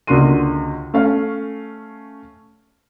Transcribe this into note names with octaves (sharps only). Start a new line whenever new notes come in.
C#2 D3 A#3 F#4 C6 D#7
A3 C#4 F5